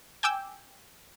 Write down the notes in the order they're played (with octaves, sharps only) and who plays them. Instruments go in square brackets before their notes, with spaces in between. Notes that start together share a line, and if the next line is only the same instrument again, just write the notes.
[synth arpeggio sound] G5 G#5 D6 E6 G6